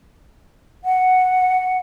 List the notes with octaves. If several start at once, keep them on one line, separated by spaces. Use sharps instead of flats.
F#5